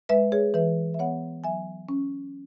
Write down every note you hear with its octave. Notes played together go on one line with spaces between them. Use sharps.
G#3 B4 E5
G#4 C#5
E3 B4 E5
E5
B3 C#5 F#5
F#3 E5 G#5
C#4